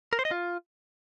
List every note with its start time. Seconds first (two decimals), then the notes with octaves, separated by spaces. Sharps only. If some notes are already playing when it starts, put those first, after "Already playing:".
0.13 A#4
0.19 C5
0.25 D#5
0.31 F4